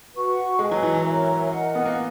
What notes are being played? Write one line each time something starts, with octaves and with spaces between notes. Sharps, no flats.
F#4 B4 F#5 C#6
G#3 B4 D#5 G#5
F#3
E3
E3
A#4 C#5 E5 A#5
A#4 D#5 F#5
B3
A#3